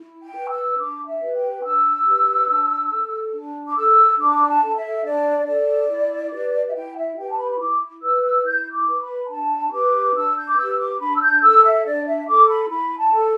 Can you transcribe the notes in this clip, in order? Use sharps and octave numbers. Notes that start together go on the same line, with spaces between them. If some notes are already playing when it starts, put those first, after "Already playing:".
Already playing: E4
G5
B4
E6
D4 D6
E5
G4 B4
G5
D4 E6
G4 B4
D4
A4
D4
D6
A4 E6
D4 D6
A5
A4
E5
D4 D5
A4 D5
E4
G4 B4
E5
E4 G5
E5
G4 B4 G5
A5
B5
B5
E4 D6
B4 E6
E6
E4 G6
D6
B4
B5
D4 A5
G4 B4 D6
D4 E6
G6
D6
G4 B4 E6
D6
D4 B5
E6
G6
A4 E6
E5
D4 D5
E5
A4 D6
B5
E4 B5
A5
A4